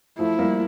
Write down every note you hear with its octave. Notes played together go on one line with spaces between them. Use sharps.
F3 A3 E4
G3 A#3